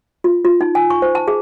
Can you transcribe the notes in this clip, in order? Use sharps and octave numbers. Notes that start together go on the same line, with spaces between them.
F4
F4
D#4
G#5
C#6
C5
A5
G#4